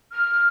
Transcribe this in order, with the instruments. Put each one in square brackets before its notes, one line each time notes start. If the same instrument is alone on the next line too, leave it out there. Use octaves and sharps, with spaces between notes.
[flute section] F6